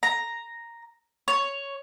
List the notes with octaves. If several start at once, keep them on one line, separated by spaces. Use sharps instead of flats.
A#5
C#5